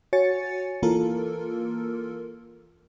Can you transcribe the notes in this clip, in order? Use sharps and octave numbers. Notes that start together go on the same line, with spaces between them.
F#4 C#5 G#5 A6 C#7
E3 A#3 F4 A4 A#4